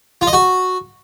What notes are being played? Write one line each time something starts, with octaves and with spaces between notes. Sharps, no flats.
F4
D#5
F#4